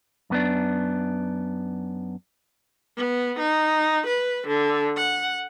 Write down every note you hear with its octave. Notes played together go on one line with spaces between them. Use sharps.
F#2 B3 D4
B3
D#4
B4
D3
F#5